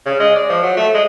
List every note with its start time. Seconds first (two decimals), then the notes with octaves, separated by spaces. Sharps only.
0.06 C#3
0.20 G#3
0.36 D5
0.50 F3
0.63 F#3
0.77 A3
0.95 G#3